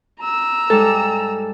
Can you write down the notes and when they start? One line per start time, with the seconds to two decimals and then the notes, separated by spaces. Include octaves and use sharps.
0.21 A#5 E6
0.70 G#2 G3 A4